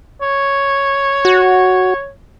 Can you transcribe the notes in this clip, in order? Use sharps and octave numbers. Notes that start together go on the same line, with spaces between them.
C#5
F#4